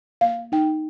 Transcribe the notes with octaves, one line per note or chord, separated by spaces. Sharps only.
A#3 F5
D#4 G5